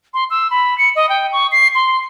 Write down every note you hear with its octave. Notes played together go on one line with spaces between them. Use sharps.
C6
E6
B5
C#7
D#5
G5
C#6
C7
C6